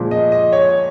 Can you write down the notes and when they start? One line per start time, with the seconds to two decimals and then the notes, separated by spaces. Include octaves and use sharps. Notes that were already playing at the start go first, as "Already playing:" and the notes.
Already playing: A#2 F3 G#3
0.11 D#5
0.32 D#5
0.53 C#5